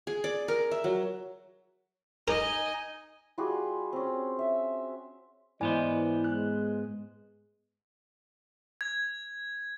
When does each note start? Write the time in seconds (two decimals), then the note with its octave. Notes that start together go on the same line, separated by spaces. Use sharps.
0.07 G#4
0.24 D5
0.48 A#4
0.71 E5
0.84 F#3
2.28 D#4 A#4 D#5 G#5
3.38 G3 F4 F#4 G#4
3.93 C4 C#4
4.39 E5
5.61 G#2 E3 B3 E4 C5 D5 D#5 G#5
6.24 G#3 F#6
8.81 G#6